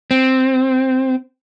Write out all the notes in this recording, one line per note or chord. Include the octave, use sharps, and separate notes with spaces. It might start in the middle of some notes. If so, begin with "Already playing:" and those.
C4